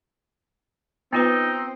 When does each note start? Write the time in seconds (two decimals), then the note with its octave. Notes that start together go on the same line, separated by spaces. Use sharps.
1.13 B3 C4 D#4 F4 B4